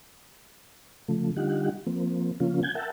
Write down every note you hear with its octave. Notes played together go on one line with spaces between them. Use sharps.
C#3 F3 A3
D3 G3 D#4 F4 G4 F#5
F3 A#3 C4
C#3 F3 A#3 C#4 F4
F#5 G#5 G6 G#6
A#4 E5 F#5 G5 A5